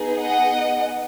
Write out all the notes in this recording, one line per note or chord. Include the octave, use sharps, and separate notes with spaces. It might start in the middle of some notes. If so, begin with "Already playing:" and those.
Already playing: B3 D#4 G#4
D#5 F#5